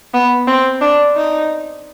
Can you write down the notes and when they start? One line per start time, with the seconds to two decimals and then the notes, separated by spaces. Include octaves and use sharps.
0.14 B3
0.47 C4
0.81 D4
1.16 D#4